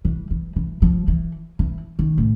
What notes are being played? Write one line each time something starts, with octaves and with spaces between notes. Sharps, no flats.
E3
E3
E3
F3
E3
E3
D#3
A2